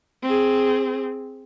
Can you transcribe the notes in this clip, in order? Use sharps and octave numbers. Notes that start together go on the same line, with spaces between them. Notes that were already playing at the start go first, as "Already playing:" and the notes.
C4 G#4